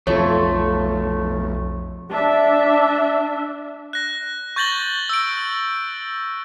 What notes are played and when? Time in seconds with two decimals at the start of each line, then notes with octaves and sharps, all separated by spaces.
0.07 B1 F2 A3 F4 C#5
2.10 D4 E5
3.93 F#6 A#6
4.56 C#6 G6 A6 A#6 F#7 G7
5.09 E6 D7